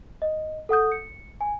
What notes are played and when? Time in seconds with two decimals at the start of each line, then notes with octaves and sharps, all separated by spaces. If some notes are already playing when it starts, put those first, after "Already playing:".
0.22 D#5
0.69 A4 F#5 D#6 G6
0.92 C#7
1.41 G#5